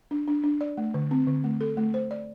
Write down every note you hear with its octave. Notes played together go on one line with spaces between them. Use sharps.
D4
D4
D4
D5
A3
D3
C4
D3
A3
A4
A3
C5
D5